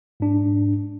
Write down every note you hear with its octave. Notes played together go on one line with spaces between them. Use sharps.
G#2 D4